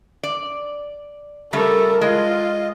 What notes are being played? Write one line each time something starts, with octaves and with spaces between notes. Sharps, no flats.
D5
C#3 G3 A3 A4 A#4
G#3 F4 D#5